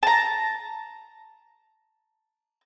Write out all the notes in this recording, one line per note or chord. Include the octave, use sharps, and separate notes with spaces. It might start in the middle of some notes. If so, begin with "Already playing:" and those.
A5 A#5